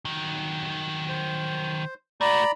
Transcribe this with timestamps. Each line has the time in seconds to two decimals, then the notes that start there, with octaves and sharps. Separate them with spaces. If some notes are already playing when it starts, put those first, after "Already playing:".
0.05 D#3 F#3
1.09 C5
2.21 A3 F#4 D5 A#5 B5